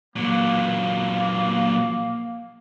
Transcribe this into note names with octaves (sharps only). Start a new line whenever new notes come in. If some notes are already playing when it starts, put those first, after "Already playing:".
A#2 F#3 A#3